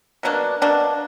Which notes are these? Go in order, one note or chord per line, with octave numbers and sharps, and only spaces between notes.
B2 F#3 A#3 D4
B2 F#3 A#3 D4